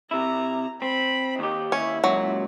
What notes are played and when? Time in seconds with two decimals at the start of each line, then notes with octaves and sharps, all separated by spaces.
0.11 C3 E4 A#5
0.82 C4 B5
1.39 D#2 D#4 G4
1.72 D#2 C#4 E4
2.04 C#2 A#2 F#3